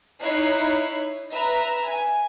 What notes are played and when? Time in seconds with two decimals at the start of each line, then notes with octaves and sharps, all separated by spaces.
0.22 D#4 E4 C#5 F#6 C7
1.32 B4 E5 A#5
1.89 G#5